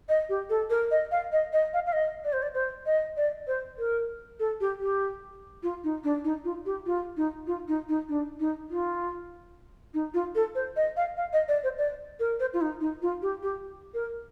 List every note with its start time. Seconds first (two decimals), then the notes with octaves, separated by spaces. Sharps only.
0.09 D#5
0.29 G4
0.50 A4
0.70 A#4
0.91 D#5
1.11 F5
1.32 D#5
1.53 D#5
1.73 F5
1.86 F5
1.93 D#5
2.24 D5
2.33 C5
2.42 D5
2.54 C5
2.86 D#5
3.17 D5
3.47 C5
3.79 A#4
4.39 A4
4.60 G4
4.80 G4
5.63 F4
5.84 D#4
6.04 D4
6.24 D#4
6.44 F4
6.66 G4
6.86 F4
7.17 D#4
7.47 F4
7.68 D#4
7.89 D#4
8.09 D4
8.40 D#4
8.70 F4
9.94 D#4
10.14 F4
10.35 A4
10.55 C5
10.76 D#5
10.96 F5
11.17 F5
11.33 D#5
11.48 D5
11.63 C5
11.78 D5
12.20 A#4
12.40 C5
12.53 F4
12.61 D#4
12.81 D#4
13.02 F4
13.22 G4
13.42 G4
13.94 A#4